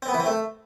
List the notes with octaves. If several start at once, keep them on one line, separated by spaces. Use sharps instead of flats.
C4
B3
E3
C4
A3